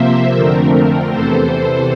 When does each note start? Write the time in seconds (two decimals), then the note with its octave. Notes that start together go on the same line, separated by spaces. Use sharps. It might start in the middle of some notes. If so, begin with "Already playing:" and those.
Already playing: C3 F3 A#3 C5 E5
0.35 F2 D3 A3 C4 A#4
1.10 E2 C3 E3 A4 C5